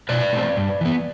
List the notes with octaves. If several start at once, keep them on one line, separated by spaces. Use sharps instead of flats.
B2 B4 D5
A3 C4
G2
E3 B3